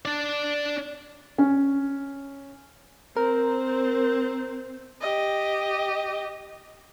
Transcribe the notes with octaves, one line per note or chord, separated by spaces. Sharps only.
D4 D5
C#4
C4 A#4 C5
G4 D#5